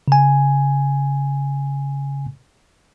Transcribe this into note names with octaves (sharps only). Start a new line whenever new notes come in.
C#3 G#5